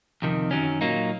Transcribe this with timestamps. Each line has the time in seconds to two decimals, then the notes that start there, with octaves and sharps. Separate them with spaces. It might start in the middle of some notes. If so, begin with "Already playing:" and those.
0.22 F2 C3 D#3
0.51 F#2 D#3 F#3 C#4
0.81 A#2 F#3 A#3 D#4